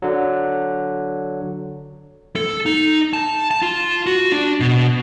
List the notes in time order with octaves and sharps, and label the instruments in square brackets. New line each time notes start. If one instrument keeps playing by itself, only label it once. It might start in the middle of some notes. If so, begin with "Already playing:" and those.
[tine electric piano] D3 F#3
[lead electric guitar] A4
D#4
A5
A5
F4
F#4
D4
B2